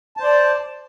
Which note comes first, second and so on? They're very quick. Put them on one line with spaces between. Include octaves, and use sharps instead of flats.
A5 C5 D5